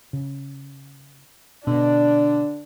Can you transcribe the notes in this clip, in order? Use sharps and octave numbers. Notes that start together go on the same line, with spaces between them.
C#3
B2 D3 D4